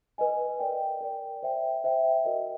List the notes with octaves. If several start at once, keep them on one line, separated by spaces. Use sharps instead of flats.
B4 D#5 G#5
A#4 D5 G5
A#4 D5 G5
C5 E5 G5
C5 E5 G5
F#4 A#4 D#5